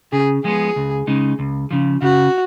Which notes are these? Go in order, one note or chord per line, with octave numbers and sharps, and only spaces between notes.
C#3 G#4
F3 G#3 B3 G#4
C#2
C#3 G#3 D#4
C#2
C#3 F3
C#3 F#4